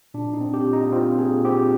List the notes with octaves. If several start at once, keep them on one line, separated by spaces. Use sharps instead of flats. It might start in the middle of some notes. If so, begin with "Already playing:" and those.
A#2 D4
D#4
C4
G4
A#2
D#4
C4 F4
A#2 G#4
C4 G4